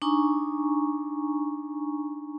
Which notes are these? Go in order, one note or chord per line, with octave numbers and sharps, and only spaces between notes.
D4 D#4 G#5 A#5 C#6